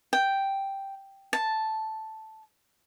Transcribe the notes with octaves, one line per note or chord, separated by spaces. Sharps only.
G5
A5